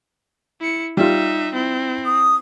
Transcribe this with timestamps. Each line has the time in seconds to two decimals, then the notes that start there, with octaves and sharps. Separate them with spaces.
0.60 E4 C#7
0.97 G3 D#4 F4 E5
1.54 C4 E4
2.05 D#6